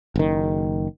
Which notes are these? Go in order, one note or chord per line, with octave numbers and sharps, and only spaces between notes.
F#1 D#3